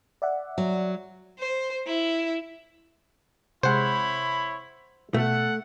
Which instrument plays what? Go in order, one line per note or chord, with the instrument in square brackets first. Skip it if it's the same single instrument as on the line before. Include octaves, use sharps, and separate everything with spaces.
[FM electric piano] D5 E5 F#5
[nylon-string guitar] F#3
[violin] C5
E4
[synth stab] C3 G#3 [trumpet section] E4 C#5 B5 [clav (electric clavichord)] C5 F#5
[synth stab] B2 [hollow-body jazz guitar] A3 [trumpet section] A4 F#5